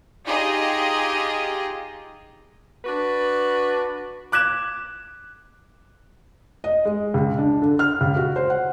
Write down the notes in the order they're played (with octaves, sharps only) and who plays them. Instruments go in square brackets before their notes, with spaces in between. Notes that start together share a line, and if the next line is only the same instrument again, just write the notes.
[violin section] D#4 F4 G4 G#4 D#5
[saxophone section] D4 F#4 B4
[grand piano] D6 F#6 G#6 E7
[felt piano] D#5
G#3
C#2
D4
D3
F6
C#2
F#4
C5
F#5